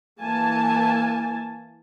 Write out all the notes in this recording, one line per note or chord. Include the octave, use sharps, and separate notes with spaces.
E3 A#3 G#5 A5